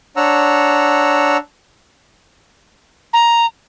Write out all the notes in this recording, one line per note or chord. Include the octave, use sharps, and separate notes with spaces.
D4 C#5 F#5 A#5 E6
A#5